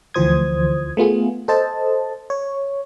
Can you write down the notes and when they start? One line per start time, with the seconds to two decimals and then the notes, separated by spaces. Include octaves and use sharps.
0.14 D2 E3 F3 C5 D#6 G#6
0.97 A3 B3 F4 G#4
1.48 A4 C5 D#5 A5
2.30 C#5